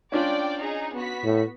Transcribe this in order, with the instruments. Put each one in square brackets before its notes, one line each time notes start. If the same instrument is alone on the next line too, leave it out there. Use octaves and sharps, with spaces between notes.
[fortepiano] C#4 D4 F4 [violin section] D5 G5
[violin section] D#4 G#4
B3 F#4 B6
[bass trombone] A2